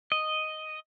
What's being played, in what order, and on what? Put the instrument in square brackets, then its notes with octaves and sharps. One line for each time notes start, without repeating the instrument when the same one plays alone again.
[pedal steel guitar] D#5